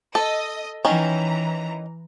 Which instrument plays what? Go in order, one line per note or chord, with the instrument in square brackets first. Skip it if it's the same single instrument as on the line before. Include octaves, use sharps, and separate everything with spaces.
[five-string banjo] A4 [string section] D#5
[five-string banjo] D#3 C#4 [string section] E3 A#5